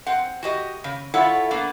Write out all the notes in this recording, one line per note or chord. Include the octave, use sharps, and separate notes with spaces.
C4 F#5
F#4 G4 D#5
C#3
E4 F4 A4 C#5 F#5
A#3 B3 D4